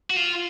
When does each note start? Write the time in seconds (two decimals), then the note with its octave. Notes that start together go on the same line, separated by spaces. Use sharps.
0.10 F#4
0.16 F4